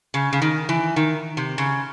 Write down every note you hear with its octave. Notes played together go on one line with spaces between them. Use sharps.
C#3
C#3
D#3
E3
D#3
C3
C#3